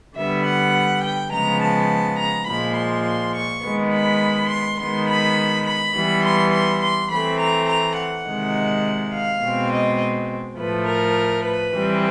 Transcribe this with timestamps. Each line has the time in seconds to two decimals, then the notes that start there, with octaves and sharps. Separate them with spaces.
0.17 D3 G3 B3 E5
0.45 F#5
1.04 G5
1.32 C#3 F3 G#3 B3 A#5
1.61 A5
2.19 A#5
2.47 A#2 F3 G#3 B5
2.77 C6
3.35 C#6
3.64 D#3 G#3 B3
3.93 B5
4.50 C6
4.80 D#3 G#3 B3 C6
5.08 B5
5.66 B5
5.96 E3 G3 B3
6.24 C6
6.53 C6
6.82 C6
7.11 E3 A3 C4 B5
7.40 A#5
7.68 A#5
7.98 F#5
8.27 C3 D#3 G#3
9.14 F5
9.43 B2 G#3 C4
9.71 D#5
10.58 A2 F3 A3 B4
10.88 A#4
11.45 B4
11.74 E3 G3 C4